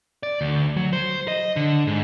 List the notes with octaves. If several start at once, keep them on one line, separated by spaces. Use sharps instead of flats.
D5
D2
F#3
C5
D#5
D3
G#2